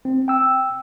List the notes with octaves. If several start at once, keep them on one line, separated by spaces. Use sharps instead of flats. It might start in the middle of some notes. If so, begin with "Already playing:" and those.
C4
G5 E6